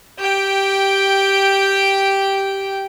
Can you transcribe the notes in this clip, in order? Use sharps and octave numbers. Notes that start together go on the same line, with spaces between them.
G4 G5